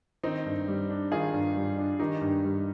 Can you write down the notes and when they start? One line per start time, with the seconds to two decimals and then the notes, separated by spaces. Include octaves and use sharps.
0.23 D#3 C4 D#4
0.45 G2
0.68 G3
0.90 D4
1.12 D#3 F4 G#4
1.33 G2
1.56 G3
1.78 D4
2.00 D#3 D#4 G4
2.21 G2
2.44 G3